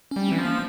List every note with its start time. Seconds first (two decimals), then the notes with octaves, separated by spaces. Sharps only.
0.11 G3 C#4
0.28 E3 C4
0.38 F3
0.45 A#3